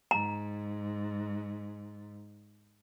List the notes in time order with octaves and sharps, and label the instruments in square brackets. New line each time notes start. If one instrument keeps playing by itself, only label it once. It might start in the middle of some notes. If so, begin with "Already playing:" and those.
[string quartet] G#2 [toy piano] A#5